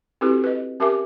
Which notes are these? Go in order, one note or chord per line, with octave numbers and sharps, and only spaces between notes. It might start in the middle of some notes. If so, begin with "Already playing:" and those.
C4 E4 F#4 G4 A4 B4
B4 D#5
C#4 G4 A#4 E5 G#5 D6